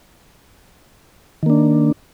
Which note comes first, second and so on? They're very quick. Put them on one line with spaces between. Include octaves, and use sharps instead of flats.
D#3 A#3 D4